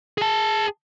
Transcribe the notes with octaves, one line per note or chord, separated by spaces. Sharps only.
G#4 A5